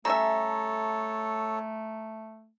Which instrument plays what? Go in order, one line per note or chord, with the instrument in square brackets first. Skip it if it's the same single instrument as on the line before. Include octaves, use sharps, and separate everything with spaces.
[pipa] G3 C#4 E5 [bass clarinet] A3 [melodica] A4 C#5 [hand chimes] A#5